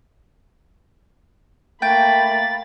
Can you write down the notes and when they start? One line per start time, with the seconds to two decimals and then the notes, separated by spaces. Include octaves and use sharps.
1.82 A3 A#3 G5 B5 A6